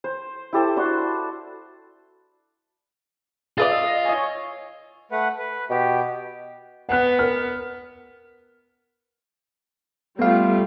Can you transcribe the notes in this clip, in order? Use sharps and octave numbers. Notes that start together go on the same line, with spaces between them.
C5
E4 G4 A4 C5
D4 F#4 C6
F4 G#4 B4 D5 E5 D#6 A6
D#5 E6
C#5 D#5 G#5
A3 B4 F#5
B4
B2 G4
B3 F#5 F#6
A#4 F6
G3 A3 B3 F4 F5